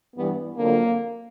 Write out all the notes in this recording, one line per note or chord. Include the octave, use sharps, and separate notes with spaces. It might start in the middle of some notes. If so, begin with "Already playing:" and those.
G2 E3 G3 B3
F2 D3 F#3 A#3